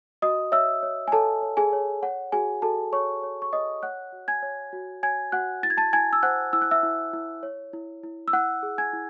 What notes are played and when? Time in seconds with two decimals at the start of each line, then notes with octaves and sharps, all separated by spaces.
0.22 F#4 D#5 D#6
0.52 C#5 E5 E6
0.83 C#5
1.08 G#5
1.12 A4 C#5 A5
1.42 C#5
1.57 G#4 G#5
1.73 C#5
2.03 C#5 F#5
2.32 F#4 G#4 G#5
2.62 F#4 A4 A5
2.93 C#5 C#6
3.23 C#5
3.42 C#6
3.53 C#5 D#5 D#6
3.83 C#5 F#5 F#6
4.12 F#4
4.28 G#5 G#6
4.42 C#5
4.73 F#4
5.03 C#5 G#5 G#6
5.32 F#4 F#5 F#6
5.63 E4 A6
5.70 G#6
5.77 A5 A6
5.93 E4 G#5 G#6
6.13 E6
6.23 C5 F#5 F#6
6.53 E4 E6
6.62 F#6
6.71 E5 E6
6.83 E4
7.13 E4
7.43 C#5
7.73 E4
8.03 E4
8.28 E6
8.33 E4 F#5 F#6
8.63 G#4
8.78 G#5 G#6
8.93 E4